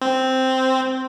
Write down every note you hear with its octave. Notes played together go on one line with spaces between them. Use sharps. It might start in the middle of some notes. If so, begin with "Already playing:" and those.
C4